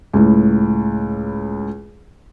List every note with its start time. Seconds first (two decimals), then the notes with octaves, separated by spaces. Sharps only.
0.14 C#2 A2